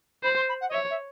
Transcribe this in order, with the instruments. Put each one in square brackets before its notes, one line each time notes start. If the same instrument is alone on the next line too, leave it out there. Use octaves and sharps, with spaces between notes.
[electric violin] C5 [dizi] B5
[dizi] C6
B5
F#5
D#5
[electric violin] C#5 [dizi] E5
[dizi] E5